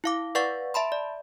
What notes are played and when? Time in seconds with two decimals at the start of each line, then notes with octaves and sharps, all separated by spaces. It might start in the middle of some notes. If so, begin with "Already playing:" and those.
0.04 E4 F5 D6
0.35 B4 D5 F5 F#5 C#6 A6
0.74 E5 A5 B5 C6
0.92 D5